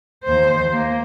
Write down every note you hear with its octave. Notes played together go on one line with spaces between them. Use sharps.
D#2 C5
A#3